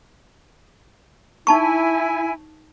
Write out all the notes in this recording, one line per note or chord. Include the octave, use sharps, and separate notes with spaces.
D#4 E4 G#5 A5 C#6